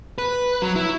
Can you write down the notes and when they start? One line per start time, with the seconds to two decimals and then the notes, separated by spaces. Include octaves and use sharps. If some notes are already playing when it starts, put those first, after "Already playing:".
0.18 B4
0.62 F#3
0.76 E4